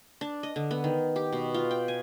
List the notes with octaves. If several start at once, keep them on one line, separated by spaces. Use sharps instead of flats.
D4
D#5
D3
B3
D#3
G4
B2
F4
G5
G#5